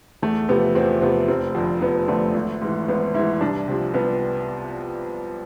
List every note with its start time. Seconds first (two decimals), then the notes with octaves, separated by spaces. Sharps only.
0.22 E2 A3
0.49 C3 F3 B3
0.75 E2 C4
1.02 C3 F3 B3
1.28 F1 C4
1.55 F2 D3 F3
1.81 F1 B3
2.08 F2 D3 F3 A3
2.34 G#1
2.62 G#2 E3
2.88 G#1 B3
3.14 G#2 E3 E4
3.41 C2 D4
3.68 C3 F3
3.94 C2 B3